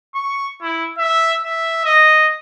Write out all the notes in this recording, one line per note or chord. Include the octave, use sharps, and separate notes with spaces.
C#6
E4
E5
E5
D#5